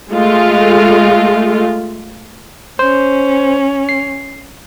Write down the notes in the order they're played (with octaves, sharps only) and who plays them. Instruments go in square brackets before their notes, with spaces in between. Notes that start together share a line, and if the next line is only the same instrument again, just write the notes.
[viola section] G#3 A3 F4
[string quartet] C#4 [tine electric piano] C5
[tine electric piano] C7